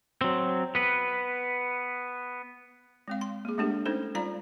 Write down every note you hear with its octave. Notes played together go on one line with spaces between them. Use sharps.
F#3 C4
B3 B4
G#3 C4 F5
C6
A#3 G#4
G#3 A3 B3 D4 G4 A4
C#4 D#4 A4 C5
G3 F4 D5 F5 A#5